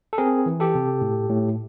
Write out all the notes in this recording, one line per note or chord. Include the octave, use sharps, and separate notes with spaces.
A4
C4 G#4 A#4
E3
G4 A4
C3
A2
A2